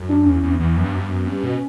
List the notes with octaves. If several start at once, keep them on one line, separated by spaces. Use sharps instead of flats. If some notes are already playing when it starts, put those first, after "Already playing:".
Already playing: F#2
D4
E2 C#4
E2
B3
E2
F#2
G2
F#2
G2
F#2
G2 C#4
B2